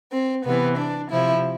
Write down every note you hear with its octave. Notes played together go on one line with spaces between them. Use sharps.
C4
C3 E3 B3
D4
C3 F3 E4